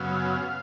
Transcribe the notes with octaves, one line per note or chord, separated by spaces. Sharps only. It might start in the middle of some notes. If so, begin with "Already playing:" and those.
Already playing: F#2 C#3 F#3 B3 F5